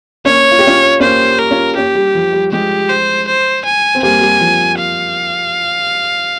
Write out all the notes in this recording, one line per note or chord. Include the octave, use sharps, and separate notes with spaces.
A#3 C#4 C#5
F4
G4
C#4 F4
A#3 C#4 C5
A#4
C#4 F4
A#3 C#4 G4
G3
F3
G3
F3 G#3 G4
C5
C5
G#5
C4
G3 A#3 G#5
G3
F3
F5